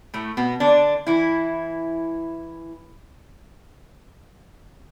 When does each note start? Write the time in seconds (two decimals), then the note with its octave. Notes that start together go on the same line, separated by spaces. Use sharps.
0.14 A2 A3
0.37 B2 B3
0.60 D3 D4
1.07 E3 E4